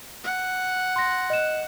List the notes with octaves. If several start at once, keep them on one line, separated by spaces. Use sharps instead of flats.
F#5
C6 A#6
D#5 F#6 E7